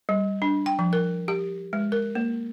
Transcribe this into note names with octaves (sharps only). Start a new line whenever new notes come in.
G3
D4
G5
F3
A#4
G4
G#3
A#4
A#3